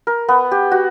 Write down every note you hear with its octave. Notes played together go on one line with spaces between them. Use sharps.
A#4
B3
G4
F#4